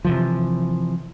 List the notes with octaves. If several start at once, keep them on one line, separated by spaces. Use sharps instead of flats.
C3 E3 F3